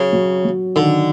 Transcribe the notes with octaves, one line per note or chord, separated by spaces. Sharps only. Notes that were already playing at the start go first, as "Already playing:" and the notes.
Already playing: C#3 F#3
F#3
F#3
D3 D#3